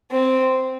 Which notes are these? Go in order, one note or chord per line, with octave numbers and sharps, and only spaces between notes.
C4